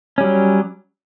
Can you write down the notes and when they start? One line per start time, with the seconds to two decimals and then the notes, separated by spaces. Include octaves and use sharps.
0.18 C#4
0.21 G3
0.23 F#3